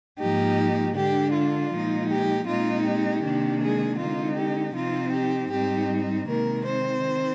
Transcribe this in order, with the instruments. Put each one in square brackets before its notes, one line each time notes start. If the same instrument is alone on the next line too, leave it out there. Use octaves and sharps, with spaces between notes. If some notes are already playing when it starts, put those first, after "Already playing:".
[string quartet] G#2 F3 A#3 D#4 G4
D3 G#3 D4 G4
F4
A#2 F3 G#3 D#4
G4
A#2 G#3 C4 D#4 F4
G4
C3 D#3 A#3 D4
G#3 G#4
D3 G#3 C4 D#4 F4
G4
C3 F3 C4 D#4 F4
G4
G#2 G3 C4 D#4 G4
C3 D#3 G#3 A#3 A#4
C4 C5
D#3